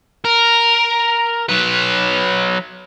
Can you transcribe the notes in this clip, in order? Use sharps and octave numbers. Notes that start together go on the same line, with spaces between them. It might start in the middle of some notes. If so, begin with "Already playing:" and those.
A#4
F#3 B4